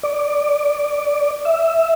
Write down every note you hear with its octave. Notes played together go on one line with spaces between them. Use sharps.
D5
E5